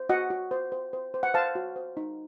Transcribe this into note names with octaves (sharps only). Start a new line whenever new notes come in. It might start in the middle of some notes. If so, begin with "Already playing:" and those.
Already playing: C5
F#4 D#5 F#5
F#4
C5
C5
C5
C5
F#5
C5 F5 A5
F#4
C5
D#4